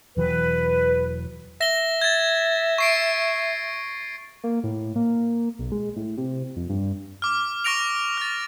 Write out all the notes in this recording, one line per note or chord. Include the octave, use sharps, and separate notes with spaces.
E1 E3 F#3 B4
E5 A#6 G7
G#6 A6
C#6 C7 D7
A#3
A2
A#3
B1
G#3
A2
C3
F2
G2
D6 F6
C#6 F6 A#6 D7 F7
F6 A6